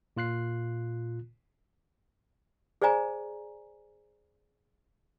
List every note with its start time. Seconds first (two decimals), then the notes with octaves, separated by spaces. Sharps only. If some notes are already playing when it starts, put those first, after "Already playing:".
0.17 A#2 F4 F#6 C7
2.82 G#4 C5 D5 G#5 A#5